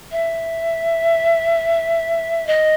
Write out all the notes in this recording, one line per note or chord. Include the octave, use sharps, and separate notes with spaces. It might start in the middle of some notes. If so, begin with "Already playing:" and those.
E5
D#5